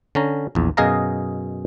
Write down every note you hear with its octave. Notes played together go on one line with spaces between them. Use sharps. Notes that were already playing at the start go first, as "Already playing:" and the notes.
D3 C#4 A#5
A#1 E2
F#2 B2 G#4 D#5 F5 A#5